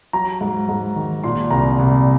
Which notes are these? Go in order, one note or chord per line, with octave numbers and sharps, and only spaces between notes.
F#3 A#5
G#2
G#2
D#3
A#2 C6
C2 A#5
C2